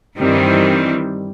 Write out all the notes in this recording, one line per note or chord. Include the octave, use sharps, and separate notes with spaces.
G2 D#3 E3 G3 C4